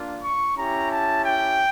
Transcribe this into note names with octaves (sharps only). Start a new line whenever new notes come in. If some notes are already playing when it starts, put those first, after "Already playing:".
Already playing: A#3 D4 F4
C#6
C#4 E4 G4 A#5
A5
G5